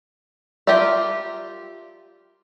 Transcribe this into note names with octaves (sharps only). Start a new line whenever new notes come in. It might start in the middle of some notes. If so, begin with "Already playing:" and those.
F4 G4 A#4 D5 E5